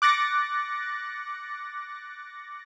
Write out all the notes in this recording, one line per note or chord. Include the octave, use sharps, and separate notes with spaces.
D6 F#6 A6 A#6 C#7